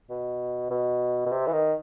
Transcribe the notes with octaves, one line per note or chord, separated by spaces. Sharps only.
B2
B2
B2
C3
E3
D#3